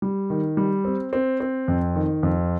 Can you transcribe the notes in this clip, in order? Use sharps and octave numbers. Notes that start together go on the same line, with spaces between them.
G3
D#3
G3
C4
C4
C4
F2
D#3
F2